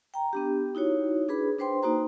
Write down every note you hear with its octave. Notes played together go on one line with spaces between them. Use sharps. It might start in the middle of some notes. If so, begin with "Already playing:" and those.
G5 A#5
B3 D4 G4
D#4 E4 F#4 C#5
D4 G#4 B4 B5
D4 B4 C5 G5 C6
A#3 D#4 F#4 C5 A#5